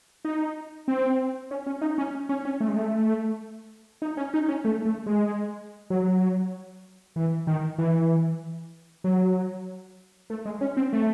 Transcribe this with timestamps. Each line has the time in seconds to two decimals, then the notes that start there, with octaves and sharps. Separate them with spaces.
0.25 D#4
0.88 C4
1.51 C#4
1.67 C#4
1.82 D#4
1.98 C#4
2.29 C#4
2.45 C#4
2.61 A3
2.68 G#3
2.76 A3
4.02 D#4
4.17 C#4
4.34 D#4
4.49 C#4
4.65 A3
4.85 A3
5.06 G#3
5.90 F#3
7.16 E3
7.47 D#3
7.78 E3
9.04 F#3
10.30 A3
10.45 G#3
10.61 C#4
10.77 C4
10.93 A3